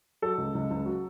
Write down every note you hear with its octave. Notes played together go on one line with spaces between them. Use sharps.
F#3 A4
C#2
C#2
C#2
F#3